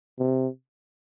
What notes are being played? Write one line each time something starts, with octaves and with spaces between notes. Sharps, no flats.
C3